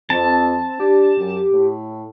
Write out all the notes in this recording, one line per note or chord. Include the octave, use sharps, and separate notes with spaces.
F2 C4 A5
D4 G4
F#2
A2